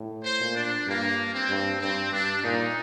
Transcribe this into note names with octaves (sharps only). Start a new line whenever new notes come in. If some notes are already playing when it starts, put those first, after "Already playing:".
Already playing: A2
C5
A#2
D4
G2 A#3
C4
G2
G2 C4
G2 D4
A#2 D#4